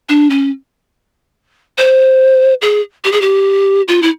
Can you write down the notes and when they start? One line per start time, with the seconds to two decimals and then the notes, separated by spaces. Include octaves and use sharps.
0.09 D4
0.30 C#4
1.78 C5
2.62 G#4
3.04 G4
3.12 G#4
3.21 G4
3.88 F4
4.02 E4